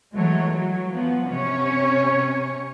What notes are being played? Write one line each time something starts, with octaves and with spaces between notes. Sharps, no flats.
E3 F#3 G#3 A3 C#5
F#3
F3 B3
C3 C#4 C#5